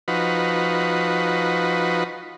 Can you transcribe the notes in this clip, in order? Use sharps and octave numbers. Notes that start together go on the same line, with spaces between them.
F3 D#4 F#4 B4